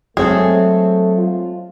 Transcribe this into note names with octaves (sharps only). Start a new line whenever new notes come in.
F#3 G#3 A3 C4 G#4 A4
F4